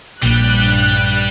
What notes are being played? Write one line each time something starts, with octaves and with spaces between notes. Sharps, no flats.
A#1 G2 G3 F#6